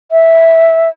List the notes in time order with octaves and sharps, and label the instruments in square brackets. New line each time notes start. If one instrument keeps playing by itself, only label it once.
[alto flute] E5